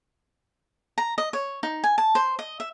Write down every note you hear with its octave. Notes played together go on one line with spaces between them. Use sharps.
A#5
D#5
C#5
D#4
G#5
A5
C5
D#5
E5